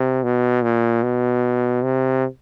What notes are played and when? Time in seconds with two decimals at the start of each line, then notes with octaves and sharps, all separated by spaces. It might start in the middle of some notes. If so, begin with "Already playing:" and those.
Already playing: C3
0.23 B2
0.62 A#2
1.03 B2
1.83 C3